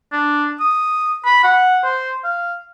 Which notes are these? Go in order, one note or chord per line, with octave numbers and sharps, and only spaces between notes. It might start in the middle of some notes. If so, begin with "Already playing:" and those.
D4
D#6
B5
F#5
C5
F5